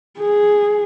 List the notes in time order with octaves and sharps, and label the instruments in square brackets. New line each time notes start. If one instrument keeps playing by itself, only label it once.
[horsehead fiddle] G#4